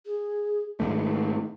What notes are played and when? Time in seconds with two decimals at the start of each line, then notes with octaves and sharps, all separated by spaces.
0.06 G#4
0.80 G#2 D#3 A3 D#4